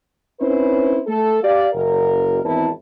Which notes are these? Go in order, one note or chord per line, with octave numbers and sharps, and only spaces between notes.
C4 C#4 D#4 E4 B4 C5
A3 A4
G4 D5 F5
F#1 A#4
G#1 E2 C4 E4 A#4 A5